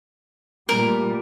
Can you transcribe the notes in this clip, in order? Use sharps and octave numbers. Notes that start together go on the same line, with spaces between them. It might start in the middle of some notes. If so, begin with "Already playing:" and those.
A#2 G3 A3 A#4